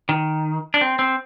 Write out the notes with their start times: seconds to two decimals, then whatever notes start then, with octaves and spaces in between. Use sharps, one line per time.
0.09 D#3
0.74 D4
0.81 C4
0.99 C4